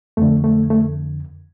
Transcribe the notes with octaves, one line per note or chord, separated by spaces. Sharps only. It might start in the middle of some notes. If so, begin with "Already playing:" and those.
F2 D3 A3
A3
A3